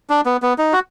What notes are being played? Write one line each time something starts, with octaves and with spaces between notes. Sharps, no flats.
D4
B3
B3
D#4
F#4